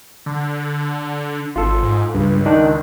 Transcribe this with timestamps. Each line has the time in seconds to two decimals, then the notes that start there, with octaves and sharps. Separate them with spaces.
0.26 D3
1.56 G#1 F4 A4
1.83 G#2
2.14 C#2 G2
2.46 D#3 D4 D#4